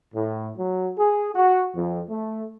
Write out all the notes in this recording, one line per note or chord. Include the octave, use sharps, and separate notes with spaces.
A2
F#3
G#4
F#4
F2
A3